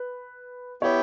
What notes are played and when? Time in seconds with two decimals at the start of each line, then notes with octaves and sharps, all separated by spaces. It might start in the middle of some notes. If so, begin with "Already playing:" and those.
Already playing: B4
0.82 B3 E4 G4 C#5